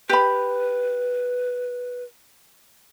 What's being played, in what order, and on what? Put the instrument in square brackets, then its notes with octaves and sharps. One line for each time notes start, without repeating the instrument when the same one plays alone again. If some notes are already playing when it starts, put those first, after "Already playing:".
[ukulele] G4 B5 [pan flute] B4